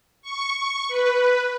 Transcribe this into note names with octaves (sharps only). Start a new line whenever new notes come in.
C#6
B4